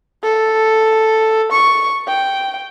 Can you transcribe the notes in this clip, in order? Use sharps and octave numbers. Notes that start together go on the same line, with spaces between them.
A4
C#6
G5